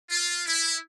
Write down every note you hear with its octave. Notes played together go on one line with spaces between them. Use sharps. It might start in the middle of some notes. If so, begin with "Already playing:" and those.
F4
E4